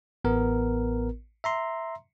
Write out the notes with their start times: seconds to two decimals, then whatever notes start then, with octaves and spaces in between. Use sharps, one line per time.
0.24 A1 B3 A#4
1.44 E5 A#5 C6